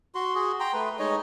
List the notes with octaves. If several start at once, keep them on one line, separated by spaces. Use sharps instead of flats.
F#4 C6
F#4 G#4
G5 A#5 C6
A3 B4
G#3 D#4 C#5 D#5